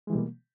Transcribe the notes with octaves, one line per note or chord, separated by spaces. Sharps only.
B2 E3 G3 G#3 A#3